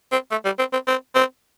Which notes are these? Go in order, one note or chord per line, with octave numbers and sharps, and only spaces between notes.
C4
A3
G3
C4
C4
C4
C4